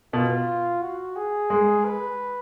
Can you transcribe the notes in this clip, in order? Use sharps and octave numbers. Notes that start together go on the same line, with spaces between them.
B2 F4
F#4
G#4
G#3
B4